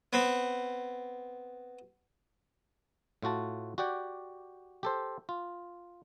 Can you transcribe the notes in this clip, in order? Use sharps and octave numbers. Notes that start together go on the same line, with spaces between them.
B3 C4
A2 F4 F#4 A5
F#4 G4 D5 F#5 G5
G4 A4 C5
F4